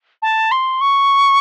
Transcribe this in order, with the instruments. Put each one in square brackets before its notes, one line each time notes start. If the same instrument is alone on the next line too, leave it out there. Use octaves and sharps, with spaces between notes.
[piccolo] A5
C6
C#6